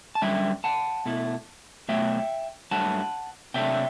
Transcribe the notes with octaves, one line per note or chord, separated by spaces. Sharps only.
A5
F#2 D3 G3 E5 G5
F#5 A5
B2 A3 E4
B2 F#3 A3 E5 G5
G2 F#3 A3 F#5 A5
C3 F#3 A3 D4 E5 G5